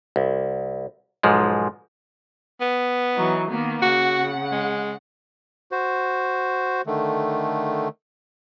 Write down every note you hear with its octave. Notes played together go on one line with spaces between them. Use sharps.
C2
B1 G#2 F3 G#3
B3
E3 F#3 D#4
D#3 A#3 B3
C#3 F#4 F#5
G#3
F#4 C5
D3 D#3 A3